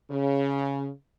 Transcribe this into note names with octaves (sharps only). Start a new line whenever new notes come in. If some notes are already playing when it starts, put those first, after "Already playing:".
C#3